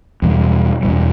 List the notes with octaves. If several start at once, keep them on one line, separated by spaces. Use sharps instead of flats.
E2 B2 G3
E2 B2 G3